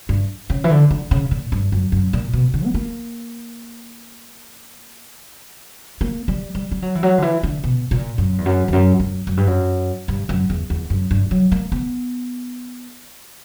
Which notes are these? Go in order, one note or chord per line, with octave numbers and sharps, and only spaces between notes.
G2
C#3
E3
D3
D3
C#3
A#2
G2
F#2
F#2
A#2
B2
D3
B3
A#3
A#3
G3
G3
G3
F#3
E3
F#3
D3
E3
D3
B2
A#2
F#2
E2
F#2
E2
F#2
F#2
F#2
G2
F#2
G2
F#2
E2
E2
F#2
G2
F#3
A#3
B3